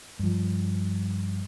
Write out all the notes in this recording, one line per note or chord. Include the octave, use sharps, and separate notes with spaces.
G2 F3